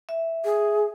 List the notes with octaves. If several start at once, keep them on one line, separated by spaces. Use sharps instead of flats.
E5
G#4